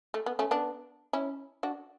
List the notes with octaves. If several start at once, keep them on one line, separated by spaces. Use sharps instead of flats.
A3
B3
A3 C#4
B3 D4
C#4 E4
D4 F#4